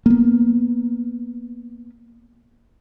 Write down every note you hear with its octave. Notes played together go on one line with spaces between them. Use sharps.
A#3 B3